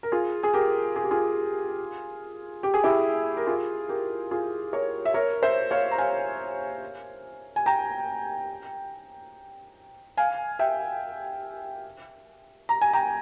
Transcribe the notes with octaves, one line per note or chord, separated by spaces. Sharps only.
A#4
F4 G#4
G#4
G4 A#4
G#4
G4
F4 G#4
G4
G#4
E4 G4
A#4
F4 G#4
G4 A#4
F4 G#4
A#4 C#5
E5
A#4 C#5
C5 E5
C#5 F5
A#5
F5 G#5
G#5
G5 A#5
F5 G#5
E5 G5
A#5
G#5
G5 A#5